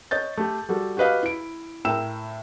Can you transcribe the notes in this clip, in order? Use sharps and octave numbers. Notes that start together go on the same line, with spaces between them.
C#5 D#5 G6 A6
A3 G4
G3 F#4 A4
F#4 G4 B4 D#5 F5
E4 D7
A2 A#4 G5 E6 E7